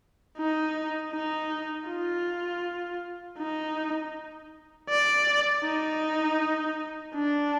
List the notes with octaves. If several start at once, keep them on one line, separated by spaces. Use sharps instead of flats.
D#4
D#4
F4
D#4
D5
D#4
D4